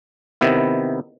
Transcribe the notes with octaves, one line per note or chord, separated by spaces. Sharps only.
C3 D#3 B3 E4